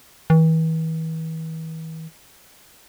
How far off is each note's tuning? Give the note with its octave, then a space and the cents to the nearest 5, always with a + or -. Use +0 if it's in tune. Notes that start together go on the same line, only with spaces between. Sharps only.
E3 -40